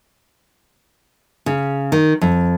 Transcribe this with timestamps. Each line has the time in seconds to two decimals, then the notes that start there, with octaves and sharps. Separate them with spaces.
1.46 C#3
1.92 D#3
2.21 F2